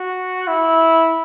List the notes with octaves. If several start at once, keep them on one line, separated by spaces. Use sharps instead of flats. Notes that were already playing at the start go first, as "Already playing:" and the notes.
Already playing: F#4
E4